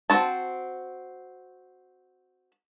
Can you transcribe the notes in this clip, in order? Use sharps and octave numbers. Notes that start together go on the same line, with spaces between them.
C4 F#4 A5